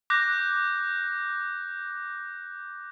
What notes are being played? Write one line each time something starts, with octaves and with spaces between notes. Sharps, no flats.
D6 F#6 G6 A#6